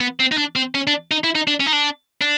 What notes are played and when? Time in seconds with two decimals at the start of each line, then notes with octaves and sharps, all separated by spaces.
0.01 B3
0.20 C4
0.32 D#4
0.38 D4
0.56 C4
0.75 C#4
0.87 D4
1.11 D#4
1.24 E4
1.35 D#4
1.48 D4
1.60 C#4
1.66 D#4
1.73 D4
2.22 D4